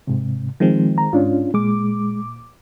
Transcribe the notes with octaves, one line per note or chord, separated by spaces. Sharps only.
G#2 C3
D#3 F3 G#3 C4
A#5
G#2 C#4 D4 F4
A#2 G#3 D6